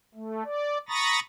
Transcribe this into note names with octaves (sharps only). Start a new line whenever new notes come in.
A3
D5
A#5 B5 C#6 D#6 A6 A#6